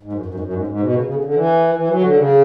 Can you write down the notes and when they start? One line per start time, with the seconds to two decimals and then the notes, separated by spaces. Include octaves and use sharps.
0.03 G#2
0.13 F#2
0.26 F#2
0.34 G#2
0.40 F#2
0.53 G#2
0.67 G#2
0.80 B2
0.94 C#3
1.04 C#3
1.14 D3
1.24 D3
1.34 E3
1.75 E3
1.88 F#3
2.01 D3
2.15 C#3